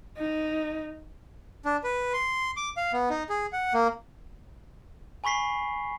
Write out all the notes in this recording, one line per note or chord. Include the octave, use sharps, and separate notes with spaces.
D#4
D4
B4
C6
D6
F5
B3
D#4
G#4
F#5
A#3
G#5 B5 C#6 B6 C7